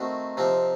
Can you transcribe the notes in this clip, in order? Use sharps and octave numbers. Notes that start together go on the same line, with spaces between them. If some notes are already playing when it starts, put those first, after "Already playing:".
Already playing: D#3 A3 C4 D#4 F#4
C3 F3 C4 D#4